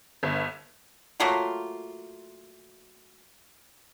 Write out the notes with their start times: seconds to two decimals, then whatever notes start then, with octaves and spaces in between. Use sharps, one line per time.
0.23 G1
1.20 F#3 A3 A#3 F4